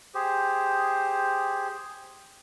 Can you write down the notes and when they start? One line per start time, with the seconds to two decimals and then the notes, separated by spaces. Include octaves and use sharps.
0.15 G4 G#4 C5